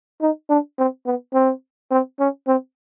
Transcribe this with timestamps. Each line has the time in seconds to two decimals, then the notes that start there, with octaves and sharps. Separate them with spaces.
0.22 D#4
0.50 D4
0.79 C4
1.06 B3
1.34 C4
1.92 C4
2.20 C#4
2.47 C4